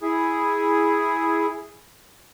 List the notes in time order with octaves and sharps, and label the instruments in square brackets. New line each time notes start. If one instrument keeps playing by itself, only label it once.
[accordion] E4 G#4